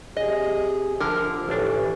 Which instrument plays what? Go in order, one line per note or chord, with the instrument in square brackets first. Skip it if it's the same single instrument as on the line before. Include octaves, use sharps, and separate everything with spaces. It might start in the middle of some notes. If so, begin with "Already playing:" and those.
[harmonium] C3 G#4 [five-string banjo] D#5
[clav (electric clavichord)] D3 [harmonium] F3 [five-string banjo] A#4
[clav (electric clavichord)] A1 D4 [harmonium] E3 [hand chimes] G4 A4 C#5